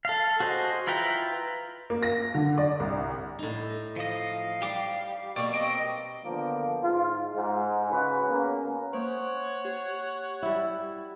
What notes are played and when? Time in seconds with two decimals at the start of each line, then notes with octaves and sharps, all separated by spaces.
0.05 A4 F5
0.40 F#4 G#4 C5 D#5
0.87 E4 F4 B4 G5 A#5
1.90 A#3
2.03 A#6
2.35 D3
2.58 D5
2.80 C2
3.39 A2 D#4
3.96 F3 D#5 F5
4.62 G3 G4 D6
5.36 B2 A#3 D5 C#6
5.54 C4 D#5 D6
6.25 D3 D#3 F3 A#3 B3
6.83 G#2 F4
7.35 G#2
7.92 C#3 F#4 G#4 B4
8.28 A#3 B3 C#4
8.93 A#3 C5 C#5 F#5
9.65 G4
10.43 G3 E4